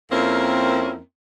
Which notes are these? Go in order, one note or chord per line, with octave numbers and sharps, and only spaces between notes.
F2 A#3 C4 C#4 E4 A#4